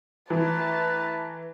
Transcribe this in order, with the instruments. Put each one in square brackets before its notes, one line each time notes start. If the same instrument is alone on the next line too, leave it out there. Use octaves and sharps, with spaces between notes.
[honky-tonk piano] E3 [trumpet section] A3 B4 A#5 [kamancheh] A5